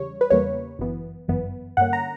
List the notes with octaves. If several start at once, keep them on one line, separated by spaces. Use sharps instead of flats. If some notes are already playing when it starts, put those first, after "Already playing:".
Already playing: E2 C#3 G3 C#5
B4
E2 C#3 G3 A#3 C#5
G1 F#2 E3 B3
G1 F#2 E3 B3
G2 D3 A#3 C#4 F#5
A#5